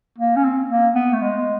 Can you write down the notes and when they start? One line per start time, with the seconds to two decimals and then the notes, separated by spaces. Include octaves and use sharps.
0.18 A#3
0.36 C#4
0.44 C4
0.70 A#3
0.96 B3
1.13 A3
1.21 G#3